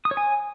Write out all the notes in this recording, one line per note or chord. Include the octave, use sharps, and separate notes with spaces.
D#6
C#5
G#5